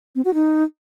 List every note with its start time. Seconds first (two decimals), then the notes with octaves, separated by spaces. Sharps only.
0.15 C4
0.25 F#4
0.34 D#4